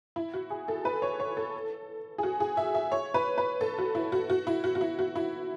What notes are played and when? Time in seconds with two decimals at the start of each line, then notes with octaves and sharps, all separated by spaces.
0.16 E4
0.34 F#4
0.50 G#4
0.68 A4
0.85 B4
1.02 C#5
1.20 C#5
1.37 A4
2.18 G#4
2.23 F#4
2.40 G#4
2.57 E5
2.75 E5
2.92 C#5
3.14 B4
3.38 B4
3.61 A4
3.78 F#4
3.95 E4
4.12 F#4
4.30 F#4
4.47 E4
4.64 F#4
4.75 F#4
4.81 E4
4.99 F#4
5.16 E4